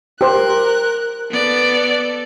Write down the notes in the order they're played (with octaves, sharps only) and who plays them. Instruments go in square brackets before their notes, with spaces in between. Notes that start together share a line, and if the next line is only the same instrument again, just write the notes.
[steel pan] G4 C5 [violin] A#4 F#6
[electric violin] B3 D5 [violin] A4